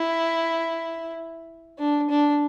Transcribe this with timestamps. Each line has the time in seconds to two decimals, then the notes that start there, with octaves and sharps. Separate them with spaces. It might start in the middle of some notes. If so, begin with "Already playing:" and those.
Already playing: E4
1.78 D4
2.10 D4